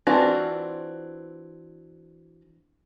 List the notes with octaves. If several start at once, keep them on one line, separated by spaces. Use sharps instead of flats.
E3 C4 D4 F4 F#4